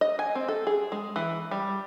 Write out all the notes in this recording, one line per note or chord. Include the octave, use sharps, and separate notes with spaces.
D#5
G#5
C4
A4
G#4
G#3
E3
G3